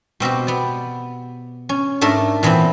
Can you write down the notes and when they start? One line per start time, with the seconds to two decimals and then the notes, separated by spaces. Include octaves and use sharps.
0.20 B2 C4 F#4 G4
0.47 B3 D5
1.69 C#4
2.01 G#2 A3 D4 A4 A#4
2.43 A#2 E3 B3 C4